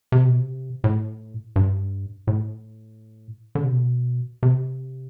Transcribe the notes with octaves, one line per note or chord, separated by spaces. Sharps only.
C3
B2
C3
A2
G2
A2
D3
C3
B2
C3